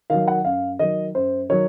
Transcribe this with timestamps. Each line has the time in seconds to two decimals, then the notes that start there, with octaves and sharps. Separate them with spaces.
0.10 D#3 F#3 F5
0.28 F#5
0.45 F#2 F5
0.79 D#3 F#3 D#5
1.15 F#2 C5
1.49 D#3 F#3 C#5